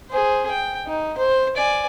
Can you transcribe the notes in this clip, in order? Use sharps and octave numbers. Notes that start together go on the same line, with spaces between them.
G#4 C5
G5
D#4
C5
D5 G#5